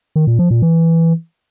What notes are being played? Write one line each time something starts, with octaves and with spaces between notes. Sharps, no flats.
D#3
A#2
F3
A#2
E3